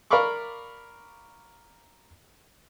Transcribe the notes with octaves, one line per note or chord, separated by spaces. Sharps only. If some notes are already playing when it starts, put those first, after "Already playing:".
A#4 D5 F5 B5 C#6 D6